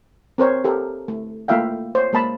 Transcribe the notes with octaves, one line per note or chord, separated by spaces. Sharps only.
C4 A#4 C5 C#5
G4 A4 A#4
A3
A3 A#3 F4 E5 F5 G5
C5 C#5
G#3 A#3 A5 B5